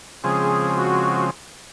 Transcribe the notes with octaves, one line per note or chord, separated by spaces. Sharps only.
C#3 F3 G#3 C4 G#4
F#4